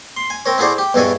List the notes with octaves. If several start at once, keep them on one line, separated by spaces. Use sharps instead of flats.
C6
G#5
C4 A#4 C#5
E4 F#4 G#4 A4 C5 D5
G4
E2 G2 B2 A4 C#5 G#5